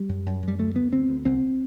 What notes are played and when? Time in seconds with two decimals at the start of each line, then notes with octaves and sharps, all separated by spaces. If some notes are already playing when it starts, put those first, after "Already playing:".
Already playing: G3
0.09 F#2
0.26 F#2
0.43 F#2
0.48 G3
0.59 D2 A3
0.75 D2 B3
0.92 D2 C4
1.09 D2
1.25 C2 C4